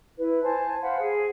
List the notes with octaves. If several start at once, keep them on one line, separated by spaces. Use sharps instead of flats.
E4 B4
C5 G#5 A5
C5 F5 F#5 B5
G#4